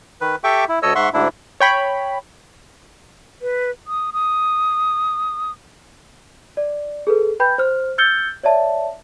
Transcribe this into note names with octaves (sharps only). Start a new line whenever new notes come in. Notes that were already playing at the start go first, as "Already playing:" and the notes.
D#3 B4
G4 A4 E5 G5 C#6 D6
E4
D2 A4 C#5 D#5 E6
G#2 E5 F#5 C6 C#6
D2 G#2 D4 E4
C#5 G5 B5
B4
D#6
D#6
D5
G#4 A4 B4
B4 G5 B5 G6
C5 F6
E6 F6 G6 A6 C#7 G7
C#5 D5 E5 A5